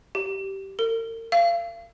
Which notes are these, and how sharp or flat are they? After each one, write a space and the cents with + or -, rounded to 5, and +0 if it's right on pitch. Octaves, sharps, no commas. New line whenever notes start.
G4 -15
A#4 -40
F5 -35